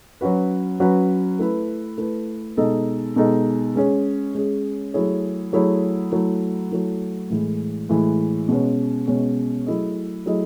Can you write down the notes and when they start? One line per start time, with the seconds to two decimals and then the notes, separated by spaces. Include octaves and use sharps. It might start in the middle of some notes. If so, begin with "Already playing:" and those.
0.21 F#3 C#4 F#4 B4
0.80 F#3 C#4 F#4 B4
1.39 A3 E4 B4
1.98 A3 E4 B4
2.57 B2 G#3 D#4 A4 D#5
3.16 B2 G#3 D#4 A4 D#5
3.76 G#3 C#4 G#4
4.35 G#3 C#4 G#4
4.94 F#3 A3 E4 G#4 C#5
5.53 F#3 A3 E4 G#4 C#5
6.12 F#3 A3 E4
6.71 F#3 A3 E4
7.30 A2 E3 G#3
7.89 A2 E3 G#3
8.48 B2 G#3 C#4
9.08 B2 G#3 C#4
9.66 F#3 A3 E4 G#4 D#5
10.26 F#3 A3 E4 G#4 D#5